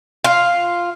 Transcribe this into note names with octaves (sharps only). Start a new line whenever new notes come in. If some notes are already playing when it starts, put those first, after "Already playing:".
F4